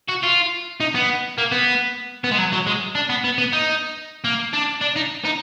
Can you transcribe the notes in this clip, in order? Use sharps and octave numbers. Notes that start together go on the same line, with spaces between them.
F#4
F4
D#4
B3
A#3
B3
B3
G#3
F#3
F#3
G#3
D4
B3
B3
B3
D#4
A#3
D4
D4
D#4
D#4